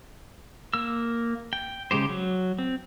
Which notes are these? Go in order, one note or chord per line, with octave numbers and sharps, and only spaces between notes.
A#3 E6
G5
C#3 G#3 G4 C5
F#3
C4